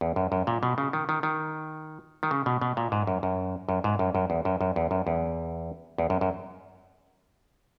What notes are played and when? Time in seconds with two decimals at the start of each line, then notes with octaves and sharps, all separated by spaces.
0.01 E2
0.16 F#2
0.32 F#2
0.47 A#2
0.63 B2
0.78 C#3
0.93 D#3
1.09 D#3
1.23 D#3
2.23 D#3
2.31 C#3
2.46 B2
2.61 B2
2.77 A#2
2.92 G#2
3.07 F#2
3.23 F#2
3.69 F#2
3.84 G#2
3.99 F#2
4.15 F#2
4.30 E2
4.45 F#2
4.61 F#2
4.76 E2
4.91 F#2
5.07 E2
5.98 E2
6.10 F#2
6.21 F#2